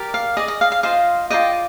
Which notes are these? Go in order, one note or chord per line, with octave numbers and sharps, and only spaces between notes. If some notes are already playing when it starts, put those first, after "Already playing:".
Already playing: G4 A#4 D5
F5
G#4 D5 D#5
D#5
F5
F5
F4 C5 D#5 F5
F4 A#4 D5 D#5 G5